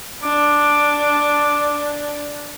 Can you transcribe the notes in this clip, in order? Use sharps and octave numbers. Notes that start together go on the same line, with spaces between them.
D4 D6